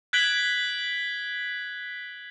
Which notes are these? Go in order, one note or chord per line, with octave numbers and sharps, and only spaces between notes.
F#6 G#6 B6 D7 F#7 G7